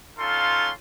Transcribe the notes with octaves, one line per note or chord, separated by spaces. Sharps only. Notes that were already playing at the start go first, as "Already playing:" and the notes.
C#4 D#4 F4 A4 F5 C6